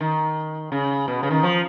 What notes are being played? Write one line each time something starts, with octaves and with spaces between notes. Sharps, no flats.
D#3
C#3
B2
C#3
D#3
F3